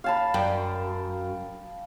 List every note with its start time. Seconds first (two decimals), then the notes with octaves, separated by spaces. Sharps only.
0.04 F5 A5 B5
0.34 F#2 G5